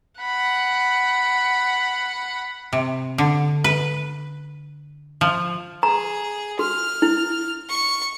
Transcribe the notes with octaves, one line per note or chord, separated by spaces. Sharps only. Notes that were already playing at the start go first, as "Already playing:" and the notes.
F#5 B5
C3
D3
B4
F3
G#4 A#5
F#4 F6
E4
C#6